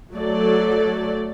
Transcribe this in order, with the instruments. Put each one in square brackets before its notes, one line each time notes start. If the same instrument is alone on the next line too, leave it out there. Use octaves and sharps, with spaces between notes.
[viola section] F#3 A3 A4 D5